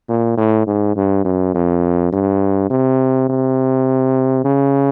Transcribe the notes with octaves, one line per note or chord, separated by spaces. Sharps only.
A#2
A2
G#2
G2
F#2
F2
G2
C3
C3
C#3